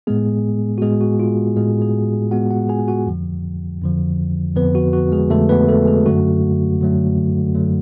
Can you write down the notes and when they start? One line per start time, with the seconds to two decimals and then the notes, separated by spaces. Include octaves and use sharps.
0.07 A2 G#3 B3 G#4
0.78 F#4
0.82 A2 G#3 B3 G#4
1.01 F#4
1.20 F4
1.57 A2 G#3 B3 G#4
1.82 G#3 G#4
2.31 A2 G#3 B3 F#4 F#5
2.51 F#4 F#5
2.69 G#4 G#5
2.88 F#4 F#5
3.06 F2 D3 F3
3.81 F2 D3 F3
4.56 F2 D3 F3 B3 B4
4.75 F#4
4.93 F#4
5.12 G#3 G#4
5.30 F2 D3 F3 A3 A4
5.49 B3 B4
5.68 A3 A4
5.87 G#3 G#4
6.06 F#2 D3 F#3 A3 F#4
6.80 F#2 D3 F#3 A3
7.55 F#2 D3 F#3 A3